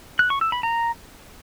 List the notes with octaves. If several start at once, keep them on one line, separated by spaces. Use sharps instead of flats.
F#6
C#6
E6
B5
A#5